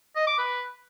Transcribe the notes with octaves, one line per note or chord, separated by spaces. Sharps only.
D#5
D6
B4